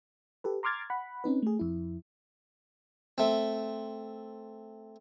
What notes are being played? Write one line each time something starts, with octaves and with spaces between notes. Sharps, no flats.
G4 A4 B4
A#5 C6 D6 F6 G#6 A6
F#5 B5
C4 C#4 D#4 B4
A3 G#4
F2 E4
A3 C4